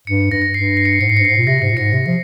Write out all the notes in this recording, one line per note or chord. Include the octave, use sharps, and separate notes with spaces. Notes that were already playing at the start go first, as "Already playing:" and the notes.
G2 C#7
G2 A#6
A#6
G2 C7
C7
C#7
C7
G#2 C#7
C7
C#7
G2
G#2 C7
A#2
C3 A#6
G#2 C7
A#2
G#2 C#7
C3
F3